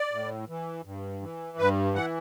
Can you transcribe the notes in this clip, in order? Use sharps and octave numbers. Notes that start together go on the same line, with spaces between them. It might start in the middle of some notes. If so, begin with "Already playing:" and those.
Already playing: D5
A2
E3
G2
E3
G2 B4
E3 F#5